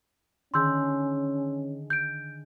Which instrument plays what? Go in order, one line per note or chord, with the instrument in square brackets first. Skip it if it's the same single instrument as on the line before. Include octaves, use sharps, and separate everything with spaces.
[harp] D3 D#3 G#4 [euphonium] C#4 [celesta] C6 E6 G6
[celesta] G6 D7